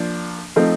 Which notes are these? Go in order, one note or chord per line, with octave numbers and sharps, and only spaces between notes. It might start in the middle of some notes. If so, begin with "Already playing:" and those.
Already playing: F3 A#3 D4
F3 A3 C4 D#4